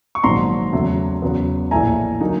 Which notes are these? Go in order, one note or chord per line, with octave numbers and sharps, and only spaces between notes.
C#6
A#1 G#2 D#3 F#3 A#5 C6
E2 C#3 F#3 A3
E2 C#3 F#3 B3
A#1 A2 E3 A3 G#5 A#5
D3 F#3 A#3 D#4